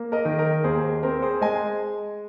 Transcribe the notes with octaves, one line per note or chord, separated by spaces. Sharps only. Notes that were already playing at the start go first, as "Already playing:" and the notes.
Already playing: A#3
A#4 D#5
D#3
A#4 D#5
D#2 G#4 C5
C4 A#4
G#4 C5
G#3 D#5 G#5